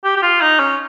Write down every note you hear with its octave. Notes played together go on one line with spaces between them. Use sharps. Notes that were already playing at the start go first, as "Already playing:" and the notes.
G4
G4
F4
D#4
C#4